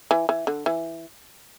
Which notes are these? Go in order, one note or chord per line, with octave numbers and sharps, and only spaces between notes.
E3
E3
D3
E3